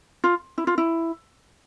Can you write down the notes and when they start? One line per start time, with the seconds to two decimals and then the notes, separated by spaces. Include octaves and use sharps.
0.24 F4
0.58 E4
0.67 F4
0.78 E4